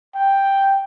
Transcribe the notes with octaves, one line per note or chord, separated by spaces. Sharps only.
G5